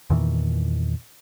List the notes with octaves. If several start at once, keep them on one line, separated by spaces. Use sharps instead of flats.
E2 A#2 D#3 E3